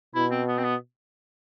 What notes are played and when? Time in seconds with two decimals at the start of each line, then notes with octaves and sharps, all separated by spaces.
0.15 B2 E4
0.31 C4
0.48 B3
0.58 C4
0.64 B3